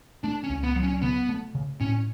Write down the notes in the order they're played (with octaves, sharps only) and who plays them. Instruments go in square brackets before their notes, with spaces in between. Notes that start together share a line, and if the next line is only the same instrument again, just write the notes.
[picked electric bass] A3 [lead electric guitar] D4
[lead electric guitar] C#4
[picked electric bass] C#2
[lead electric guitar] B3
[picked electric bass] F#3
[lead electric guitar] C#4
[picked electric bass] C#3 [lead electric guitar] B3
[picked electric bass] A3
C#3
[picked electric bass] A2 [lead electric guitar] C#4